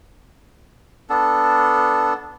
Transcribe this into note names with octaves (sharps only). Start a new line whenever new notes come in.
B3 D4 A4